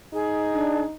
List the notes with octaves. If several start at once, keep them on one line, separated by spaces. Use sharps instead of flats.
D#4 G#4
D4